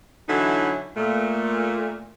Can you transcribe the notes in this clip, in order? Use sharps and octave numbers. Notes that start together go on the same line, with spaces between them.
D3 E3 F#3 C#4 D#4 E4
A#2 A3